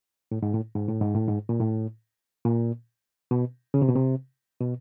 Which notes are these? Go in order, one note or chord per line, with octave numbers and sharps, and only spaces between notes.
A2
G#2
A2
G#2
A2
G#2
A2
G#2
A#2
A2
A#2
B2
C#3
C3
B2
C3
B2